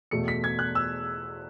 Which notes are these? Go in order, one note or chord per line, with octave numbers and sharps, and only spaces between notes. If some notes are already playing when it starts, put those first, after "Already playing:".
E2 B2 A3 C#7
B6
G#6
F#6
E6